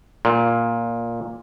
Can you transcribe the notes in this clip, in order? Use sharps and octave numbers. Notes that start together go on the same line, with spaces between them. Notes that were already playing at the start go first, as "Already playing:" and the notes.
A#2